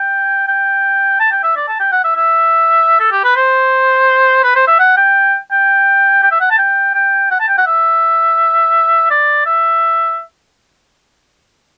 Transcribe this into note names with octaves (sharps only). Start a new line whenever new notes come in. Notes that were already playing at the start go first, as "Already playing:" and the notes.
Already playing: G5
G5
A5
G5
E5
D5
A5
G5
F#5
E5
E5
A4
G4
B4
C5
B4
C5
E5
F#5
G5
G5
G5
E5
F#5
A5
G5
G5
F#5
A5
G5
F#5
E5
D5
E5